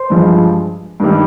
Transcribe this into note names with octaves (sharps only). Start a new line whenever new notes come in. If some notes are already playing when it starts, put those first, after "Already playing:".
Already playing: C5 C6
G2 F3 G#3
G2 D#3 G3